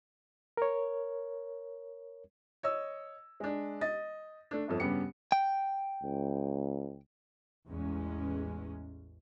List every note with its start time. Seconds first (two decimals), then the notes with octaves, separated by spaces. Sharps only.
0.57 A#4 C#5
2.63 C#5 D#5 E6
3.40 G#3 D4
3.81 D#5 A6
4.51 A3 D4
4.68 G1 F2 A4
4.80 G2 C#3 B3 G4 C#7
5.32 G5
6.03 C#2
7.67 A1 E2 G#3 C#4